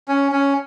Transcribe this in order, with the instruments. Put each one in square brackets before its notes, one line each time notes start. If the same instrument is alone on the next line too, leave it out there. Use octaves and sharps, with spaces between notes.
[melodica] C#4
C#4